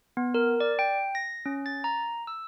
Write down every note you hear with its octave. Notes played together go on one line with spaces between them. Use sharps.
B3
A#4
D5
G5
A#6
C#4
A6
A#5
E6